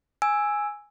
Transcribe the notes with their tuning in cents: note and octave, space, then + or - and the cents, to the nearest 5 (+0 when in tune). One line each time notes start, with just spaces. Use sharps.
G#5 +0 E6 +0